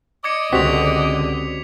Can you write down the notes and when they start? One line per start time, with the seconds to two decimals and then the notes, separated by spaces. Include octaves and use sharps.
0.24 D5 D#5 D6 G#6 C#7
0.53 C#2 D3 C4 F#4 G4 B6 F7